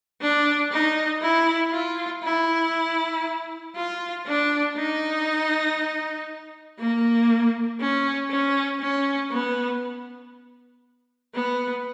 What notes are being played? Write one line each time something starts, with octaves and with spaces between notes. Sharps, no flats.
D4
D#4
E4
F4
E4
F4
D4
D#4
A#3
C#4
C#4
C#4
B3
B3